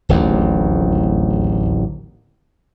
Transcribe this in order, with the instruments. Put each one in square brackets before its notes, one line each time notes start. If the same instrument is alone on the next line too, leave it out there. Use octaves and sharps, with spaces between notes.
[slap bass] D1 A1 D#2